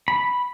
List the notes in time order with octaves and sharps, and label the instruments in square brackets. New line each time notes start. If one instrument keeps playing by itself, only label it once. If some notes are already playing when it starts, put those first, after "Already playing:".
[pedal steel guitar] B5